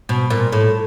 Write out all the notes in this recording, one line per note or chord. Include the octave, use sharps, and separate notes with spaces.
B2
A#2
A2